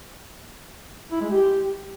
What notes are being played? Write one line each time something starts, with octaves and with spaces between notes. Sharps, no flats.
E4
G#3
G4